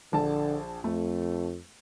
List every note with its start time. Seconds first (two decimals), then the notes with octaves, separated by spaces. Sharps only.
0.13 A#1 D3 A5
0.84 F2 A3